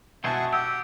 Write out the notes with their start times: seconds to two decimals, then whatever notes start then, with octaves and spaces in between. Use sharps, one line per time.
0.24 B2 G#3 C4 G#4 E5 F#5 A5 C#6
0.53 G4 F#5 D#6 E6